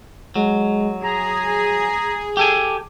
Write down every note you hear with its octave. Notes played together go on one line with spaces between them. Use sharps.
F#3 G#3
G#4 A#5
G4 A4 G#5 D6